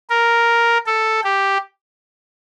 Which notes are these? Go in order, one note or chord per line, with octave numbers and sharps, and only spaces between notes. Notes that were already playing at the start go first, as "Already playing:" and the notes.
A#4
A4
G4